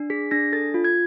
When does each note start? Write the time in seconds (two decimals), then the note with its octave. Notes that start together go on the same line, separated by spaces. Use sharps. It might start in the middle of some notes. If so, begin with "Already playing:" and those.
Already playing: D4
0.10 G#4 B6
0.31 D4 A#6
0.53 A4 A6
0.74 F4
0.84 G#6